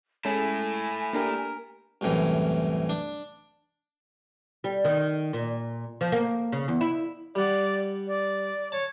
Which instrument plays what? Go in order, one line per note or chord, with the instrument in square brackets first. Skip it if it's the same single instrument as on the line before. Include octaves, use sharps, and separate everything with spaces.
[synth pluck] G#3 C#4 A4 [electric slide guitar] A3 E4 [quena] G#5
[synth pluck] A#3 D4 G4 [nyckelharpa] A#4
[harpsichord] C2 F#2 A2 E3
D4
[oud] G3
D#3
A#2
F3
A#3
C#3
E2
E4
[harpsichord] G3 F#5 [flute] D5
[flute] D5
[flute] C#5 [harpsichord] A5